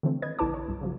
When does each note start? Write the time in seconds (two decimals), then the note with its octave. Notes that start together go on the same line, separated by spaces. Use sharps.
0.03 D3 E3 F3 A3 C4
0.22 B4 D#5 G#6
0.39 A#1 D3 E4 B4 A5 D6
0.54 C#5
0.68 B1 G2
0.81 C#3 F3 F#3